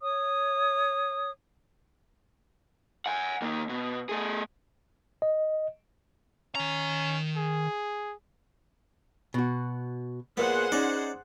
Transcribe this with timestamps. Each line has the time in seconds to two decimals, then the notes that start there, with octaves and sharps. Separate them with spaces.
0.02 C#5 D#6
3.06 F#5 G#5
3.42 D#3 A#3
3.69 B2
4.09 A3 G#4
5.22 D#5
6.55 D#3 C#4 A#5
7.37 G#4
9.34 B2 F#4
10.37 A#2 B3 G#4 C5 F#5
10.72 C#4 D#4 D5